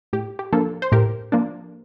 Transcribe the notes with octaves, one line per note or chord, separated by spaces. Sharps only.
A2 G4
G4
F3 A#3 D4 A4
C5
A2 G4 A#4
F3 A#3 D4